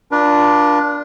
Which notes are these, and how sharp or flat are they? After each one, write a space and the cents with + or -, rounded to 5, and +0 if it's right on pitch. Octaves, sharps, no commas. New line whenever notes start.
D4 +0 F4 +0 A#4 +40